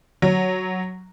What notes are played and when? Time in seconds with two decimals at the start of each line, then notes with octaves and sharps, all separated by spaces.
0.22 F#3